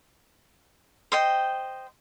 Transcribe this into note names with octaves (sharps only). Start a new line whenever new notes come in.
C5 D#5 G5